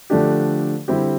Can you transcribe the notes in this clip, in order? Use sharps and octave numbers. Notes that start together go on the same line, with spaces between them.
D3 F3 A3 D4 G4
D3 G3 C4 E4 G4